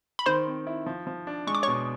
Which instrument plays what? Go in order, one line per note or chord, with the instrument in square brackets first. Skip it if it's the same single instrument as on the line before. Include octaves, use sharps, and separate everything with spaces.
[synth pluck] B5
[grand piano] D#3 [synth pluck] C5 C6
[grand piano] C4
E4
F3
F3
D4
[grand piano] G#3 [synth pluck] C#6
[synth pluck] D6
[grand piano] B2 [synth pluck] C#5 C#6